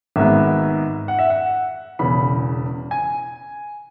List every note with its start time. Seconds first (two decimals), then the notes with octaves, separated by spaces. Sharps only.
0.16 G#1 G#2 G#3 B3 E5
1.08 F#5
1.19 E5
1.30 F#5
1.99 E1 E2 C#3 B5
2.91 G#5